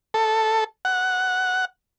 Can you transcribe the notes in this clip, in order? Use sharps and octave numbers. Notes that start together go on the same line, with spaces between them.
A4
F#5